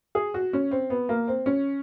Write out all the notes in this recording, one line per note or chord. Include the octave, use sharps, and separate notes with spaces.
G#4
F#4
C#4
C4
B3
A#3
C4
C#4